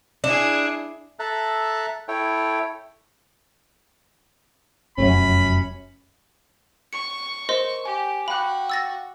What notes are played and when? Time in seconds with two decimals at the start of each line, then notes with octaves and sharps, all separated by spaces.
0.24 D4 E4 G#4
1.19 A4 E5 A5 A#5 F#6
2.08 E4 A4 C#5 G5
4.98 F1 F#2 C#4 B5
6.93 C#6 C#7
7.49 A#4 C5 D#5 C6
7.85 G4 G#5
8.28 F#4 F5 G5 B5 D6 F#6
8.70 E6 A6 A#6